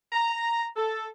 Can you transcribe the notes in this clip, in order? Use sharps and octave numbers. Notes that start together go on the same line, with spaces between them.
A#5
A4